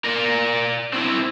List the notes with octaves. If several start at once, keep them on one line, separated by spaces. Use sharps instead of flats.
A#4 D5
C4 E4